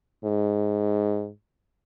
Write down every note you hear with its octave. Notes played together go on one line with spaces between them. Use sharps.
G#2